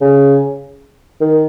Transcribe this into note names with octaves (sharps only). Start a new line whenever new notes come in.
C#3
D#3